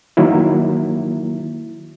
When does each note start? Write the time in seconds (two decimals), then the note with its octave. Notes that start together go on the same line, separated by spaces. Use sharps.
0.17 D#3 F#3 A#3 E4